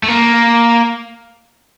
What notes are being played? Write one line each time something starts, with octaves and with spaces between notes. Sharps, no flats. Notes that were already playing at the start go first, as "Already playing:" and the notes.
A3
A#3